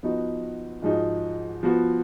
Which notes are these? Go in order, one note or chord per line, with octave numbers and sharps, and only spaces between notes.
F3 B3 D#4 F#4
G#2 F3 G#3 D#4 F#4
F3 B3 F#4